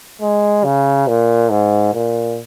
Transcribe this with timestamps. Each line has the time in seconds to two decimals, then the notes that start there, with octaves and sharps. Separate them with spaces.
0.22 G#3
0.64 C#3
1.08 A#2
1.51 G#2
1.94 A#2